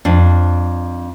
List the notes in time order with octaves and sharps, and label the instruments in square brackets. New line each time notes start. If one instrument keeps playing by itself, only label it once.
[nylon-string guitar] F2 D4